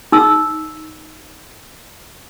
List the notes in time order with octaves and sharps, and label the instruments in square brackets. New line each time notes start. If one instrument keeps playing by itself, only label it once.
[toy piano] D#4 E6